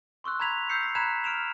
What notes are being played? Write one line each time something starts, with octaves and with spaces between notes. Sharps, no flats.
C6 C#6 E6 F#6
A#5 B5 G#6 B6 F7
E6 G6 C7 C#7
B6
A#5 B5 F#6 G#6 E7
F6 D7 E7 F7